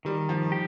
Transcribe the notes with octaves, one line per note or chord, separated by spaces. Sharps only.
D#3 G3
F3
G4